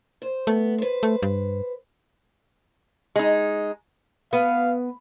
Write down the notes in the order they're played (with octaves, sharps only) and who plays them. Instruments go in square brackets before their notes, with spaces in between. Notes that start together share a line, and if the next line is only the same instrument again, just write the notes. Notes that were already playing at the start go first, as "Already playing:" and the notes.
[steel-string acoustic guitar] C5
[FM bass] A3 [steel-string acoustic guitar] B3
[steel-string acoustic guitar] B4 C5
[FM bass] A3
G2
[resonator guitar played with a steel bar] G#3 D#4
[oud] B3 [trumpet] F5